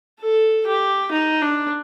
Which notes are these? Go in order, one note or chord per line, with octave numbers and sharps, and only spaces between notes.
A4
G4
D#4
D4